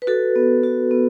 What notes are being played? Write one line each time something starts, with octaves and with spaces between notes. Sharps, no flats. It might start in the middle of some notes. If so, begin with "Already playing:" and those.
B4
F#4 A4
B3
F#4
B3